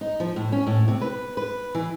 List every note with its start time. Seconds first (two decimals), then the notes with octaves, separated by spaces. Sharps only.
0.01 D#4
0.20 F3
0.36 A2
0.52 C#4
0.67 A2
0.88 C3
1.01 B4
1.37 B4
1.75 E3